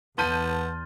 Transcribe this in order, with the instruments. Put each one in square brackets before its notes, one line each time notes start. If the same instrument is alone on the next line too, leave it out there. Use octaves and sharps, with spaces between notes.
[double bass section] E2 [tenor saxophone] B3 [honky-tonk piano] A5 G6 D#7 [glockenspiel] C6 F6 A6